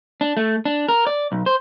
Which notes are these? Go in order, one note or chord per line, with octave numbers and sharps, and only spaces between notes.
D4
A3
D4
A#4
D5
B1
C5